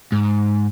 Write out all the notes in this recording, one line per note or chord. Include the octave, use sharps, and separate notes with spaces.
G#2